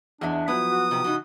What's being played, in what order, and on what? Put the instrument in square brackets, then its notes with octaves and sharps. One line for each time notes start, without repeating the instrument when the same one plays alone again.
[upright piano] E2 [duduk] D4 [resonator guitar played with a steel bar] G#4 D#5 E5
[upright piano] F3 F#3 B3 [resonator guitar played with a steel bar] E4 [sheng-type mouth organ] D#6
[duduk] F#4
[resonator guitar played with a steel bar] G#2 G4 [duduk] C3
[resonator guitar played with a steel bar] A2 C#3 D#4 [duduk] F#4